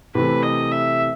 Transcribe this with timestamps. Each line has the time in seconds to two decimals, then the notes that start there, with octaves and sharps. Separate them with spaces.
0.15 C3 E3 A3 B4
0.43 D#5
0.72 E5